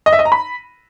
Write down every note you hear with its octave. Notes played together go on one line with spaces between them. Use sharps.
D#5
E5
D#5
A#5
B5